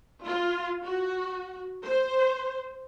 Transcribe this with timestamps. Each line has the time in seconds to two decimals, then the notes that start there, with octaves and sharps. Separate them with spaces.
0.25 F4
0.84 F#4
1.85 C5